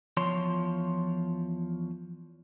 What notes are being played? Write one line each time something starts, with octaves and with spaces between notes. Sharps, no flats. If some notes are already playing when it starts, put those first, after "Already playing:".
E2 F3 C#5 C6